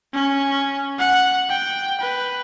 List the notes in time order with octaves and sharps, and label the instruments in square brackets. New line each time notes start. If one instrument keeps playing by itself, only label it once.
[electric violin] C#4
F#5
G5
B4